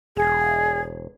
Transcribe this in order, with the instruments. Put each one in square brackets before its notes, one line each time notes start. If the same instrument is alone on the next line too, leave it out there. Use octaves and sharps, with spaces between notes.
[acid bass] E1 [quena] G#4